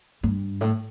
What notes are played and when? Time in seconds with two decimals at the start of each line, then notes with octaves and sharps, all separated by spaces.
0.23 G2
0.61 A2